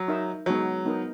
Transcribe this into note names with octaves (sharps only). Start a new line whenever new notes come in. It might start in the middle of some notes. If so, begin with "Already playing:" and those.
Already playing: F#3
D#4 A#4 E5
F#3 G#3 B3 D#4 F#4 C#5
B3 D#4 A#4